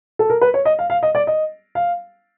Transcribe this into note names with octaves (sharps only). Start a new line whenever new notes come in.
A4
A#4
B4
C#5
D#5
F5
F5
D#5
D5
D#5
F5